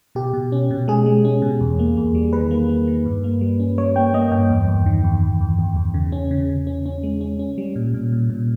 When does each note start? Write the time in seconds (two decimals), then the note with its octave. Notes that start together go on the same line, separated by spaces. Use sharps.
0.15 B2 G4
0.34 B2
0.52 C#4
0.71 B2
0.88 G#3 G#4
1.06 G#3
1.25 C#4
1.42 B2
1.60 E2
1.79 A#3
1.97 E2
2.15 G3
2.33 D#3 B4
2.51 A#3
2.69 A#3
2.88 D#3
3.06 G2
3.24 A#3
3.41 G3
3.60 C#4
3.78 G3 C#5
3.96 A#3 G5
4.14 A#3 D#5
4.31 G2 G5
4.50 E2
4.68 E2
4.86 D#3
5.04 E2
5.23 E2
5.41 E2
5.59 E2
5.76 E2
5.94 C#3
6.12 C#4
6.31 C#3
6.50 C#3
6.67 C#4
6.86 C#4
7.03 G#3
7.21 C#4
7.39 C#4
7.58 G3
7.76 A#2
7.94 A#2
8.12 A#2
8.30 A#2